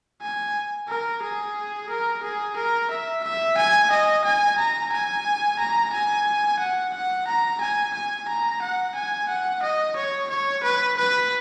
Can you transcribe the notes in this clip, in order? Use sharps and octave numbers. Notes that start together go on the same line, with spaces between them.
G#5
A#4
G#4
A#4
G#4
A#4
E5
E5
G#5
D#5
G#5
A#5
G#5
A#5
G#5
F#5
F#5
A#5
G#5
G#5
A#5
F#5
G#5
F#5
D#5
C#5
C#5
B4
B4